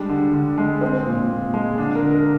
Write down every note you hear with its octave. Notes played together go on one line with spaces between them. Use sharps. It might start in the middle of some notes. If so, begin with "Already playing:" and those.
Already playing: G3 G#3 D4
D3
D3
G#3
G#3 C4
A#2
A#2
G#3
D3 D4
A#4
D3
A#4